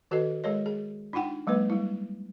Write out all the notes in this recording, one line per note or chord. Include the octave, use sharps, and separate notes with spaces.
D#3 F#4 A4 B4 D#5
G#3 G#4 A#4 C#5 D#5
G#4
D4 D#4 F4 F#5 G5
F#3 G#3 A#3 B4
G3 E4